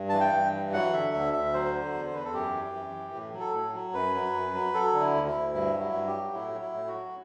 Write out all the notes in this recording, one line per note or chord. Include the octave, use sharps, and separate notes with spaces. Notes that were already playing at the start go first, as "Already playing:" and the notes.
Already playing: G2
E3 A5
G5
G2
E3
F#3 F#5
D3 E5
D2 E5
D2 E5
F#3 C5
D3
E2
C5
E2 B4
A4
F#2 G4
E3
F#2
E3
A2
F#3
A4
A2
F#3
F#2 B4
F#3
F#2
F#3
F#3 A4
D3
E4
D2
E4
D2
G2 E4
F#3
E4
G2
G4
F#3
A2 E4
F#3
E4
A2
F#4
F#3